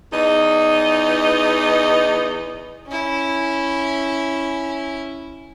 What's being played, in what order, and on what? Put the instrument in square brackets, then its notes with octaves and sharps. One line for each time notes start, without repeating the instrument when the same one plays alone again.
[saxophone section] E2 D#4
[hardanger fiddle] C#4 E4